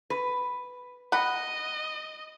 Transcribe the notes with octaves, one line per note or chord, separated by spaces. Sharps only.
B4
D#5 F#5 B5